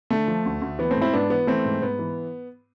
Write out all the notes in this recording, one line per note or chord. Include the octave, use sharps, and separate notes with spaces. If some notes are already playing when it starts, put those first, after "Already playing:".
D3 A3
F3
D2
D2
E3 B3
A3 C4
G#2
C4 E4
G#2 B3 D4
E3 B3
E3 A3 C4
G#2
G#2 B3
E3